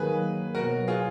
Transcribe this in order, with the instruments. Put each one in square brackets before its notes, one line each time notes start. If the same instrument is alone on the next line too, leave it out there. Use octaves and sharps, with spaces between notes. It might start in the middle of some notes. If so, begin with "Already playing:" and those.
Already playing: [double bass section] D#3 F#3 A#3 [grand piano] G#4 B4
[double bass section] B2 F#3 B3 [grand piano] F#4 A#4
[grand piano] F4 G#4